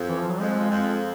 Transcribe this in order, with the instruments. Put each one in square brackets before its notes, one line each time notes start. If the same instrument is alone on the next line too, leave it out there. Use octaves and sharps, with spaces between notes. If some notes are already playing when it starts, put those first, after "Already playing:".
Already playing: [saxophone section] F2
[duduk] E3
F3
F#3
[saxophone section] F2 [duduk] G#3
[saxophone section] F2